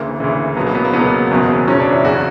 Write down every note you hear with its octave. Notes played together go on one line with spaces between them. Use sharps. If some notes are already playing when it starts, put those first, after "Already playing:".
Already playing: D2 C#3 E3 A#3
D2 C#3 E3
C#2 B2 F#3 B3
A#3
B3
A#3
C#2 B2 F#3 B3
F#1 E2 B2 F#3
F#1 E2 B2 F#3 C#4
D4
E4
E2 C#3 F#4